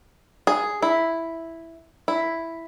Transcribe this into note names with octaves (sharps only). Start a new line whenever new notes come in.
G#4
E4
E4